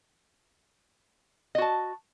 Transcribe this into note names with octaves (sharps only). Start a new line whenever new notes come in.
F#4 D#5 A5